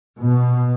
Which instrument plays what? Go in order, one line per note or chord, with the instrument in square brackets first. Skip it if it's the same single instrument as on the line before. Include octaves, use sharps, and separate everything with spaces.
[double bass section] B2